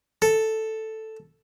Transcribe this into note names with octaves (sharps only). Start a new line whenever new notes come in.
A4